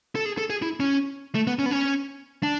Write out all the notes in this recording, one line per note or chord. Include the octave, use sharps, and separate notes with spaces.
A4
G#4
A4
G#4
E4
C#4
A3
B3
C#4
B3
C#4
D4